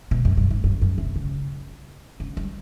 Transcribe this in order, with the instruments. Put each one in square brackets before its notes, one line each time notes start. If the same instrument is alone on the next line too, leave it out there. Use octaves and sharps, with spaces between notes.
[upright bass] B2
F#2
G2
G#2
G2
F#2
C3
C#3
C#3
G3